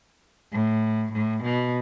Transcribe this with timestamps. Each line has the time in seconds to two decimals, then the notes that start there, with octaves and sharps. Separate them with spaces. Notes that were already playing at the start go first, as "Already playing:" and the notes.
0.52 A2
1.13 A2
1.44 B2